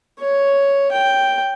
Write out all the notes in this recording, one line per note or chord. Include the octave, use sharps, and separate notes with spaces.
C#5
G5